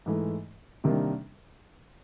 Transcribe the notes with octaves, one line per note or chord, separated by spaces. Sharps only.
G#2 E3 A3
C3 D#3 G3 A#3 D4